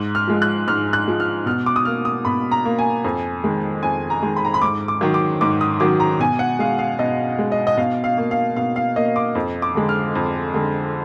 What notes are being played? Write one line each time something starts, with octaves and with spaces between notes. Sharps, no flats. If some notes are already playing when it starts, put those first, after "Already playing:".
Already playing: G#2 F#6
F6
F3 G#3
F#6
G#2 F6
F#6
F3 G#3
F6
B2 F6
D6
D#6
A#3 F6
D#6
B2 B5
A#5
A#3
G#5
F2
D#3 G#3
F2 G#5
A#5
D#3 G#3
B5
A#5
B5
G#2 D6
D6
D#3 F#3
D6
G#2 D6
D#6
D#3 F#3 D6
A#5
B2 G#5
F#5
G#3 F5
F5
B2 D#5
G#3
D#5
D#5
B2 F5
F5
A#3
F5
B2 F5
F5
A#3 D#5
D6
F2
D6
D3 G#3
F6
F2
D3 G#3